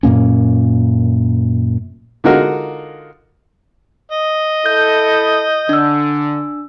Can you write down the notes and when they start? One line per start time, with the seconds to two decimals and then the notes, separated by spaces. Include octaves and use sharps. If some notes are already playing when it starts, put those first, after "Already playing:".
0.03 F#2 A#2 A#3 C#4
2.24 D3 G#3 D#4 F4 F#4 A#4
4.12 D#5
4.66 E4 A4 G6
5.69 D3 D4 E6